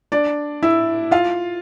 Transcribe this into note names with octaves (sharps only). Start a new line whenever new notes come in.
D4 D5
E4 E5
F4 F5